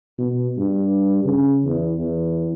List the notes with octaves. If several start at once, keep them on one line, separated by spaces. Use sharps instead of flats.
B2
G2
C#3
E2
E2